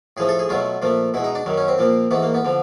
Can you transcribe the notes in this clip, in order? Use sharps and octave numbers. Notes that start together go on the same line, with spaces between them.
A2 F3 A3 G#4
A4
G#4
B2 F#3 A3 F4
A#2 F3 A3
B2 G#3 E4
D#4
D4
F#2 D#3 F#3
C#4
C4
A#2 F3 A#3
G#2 E3 A3 B3
A#3
B3
D3 F3